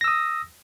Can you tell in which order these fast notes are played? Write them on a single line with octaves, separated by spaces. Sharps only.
A#6 E6 D#6